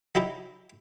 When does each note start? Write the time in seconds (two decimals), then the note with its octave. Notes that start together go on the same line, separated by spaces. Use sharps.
0.15 F#3 D#4 E4 G4